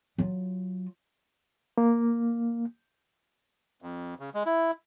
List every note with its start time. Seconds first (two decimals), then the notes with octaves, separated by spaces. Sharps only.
0.18 F#3 F4
1.78 A#3
3.82 F2
4.19 C#3
4.34 G#3
4.46 E4